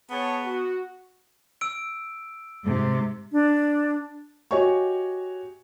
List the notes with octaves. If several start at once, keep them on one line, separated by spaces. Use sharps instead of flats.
B3 G#4 C#5 A5
F#4
E6 D7
G#2 C3
D4
F#4 G4 C#5 D#5 G#5 C#6